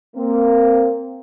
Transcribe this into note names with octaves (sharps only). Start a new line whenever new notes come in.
A#3 C4